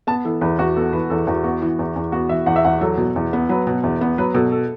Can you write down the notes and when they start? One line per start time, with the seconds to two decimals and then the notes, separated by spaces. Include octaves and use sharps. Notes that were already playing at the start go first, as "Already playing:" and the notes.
0.07 B3 A5
0.25 E3 A4
0.41 E2 B4
0.58 E2 F#4
0.76 B3 A4
0.93 E3 B4
1.10 E2 A4
1.27 E2 F#4
1.44 B3 F#4
1.62 E3
1.79 E2
1.96 E2
2.12 B3 F#4
2.29 E3 E5
2.46 E2 F#5
2.56 E5
2.64 E2 F#5
2.81 F#3 A4
2.98 B2
3.16 E2
3.33 B3
3.49 F#3 B4
3.67 B2
3.83 E2
4.01 B3
4.18 F#3 B4
4.34 B2 A4
4.52 A4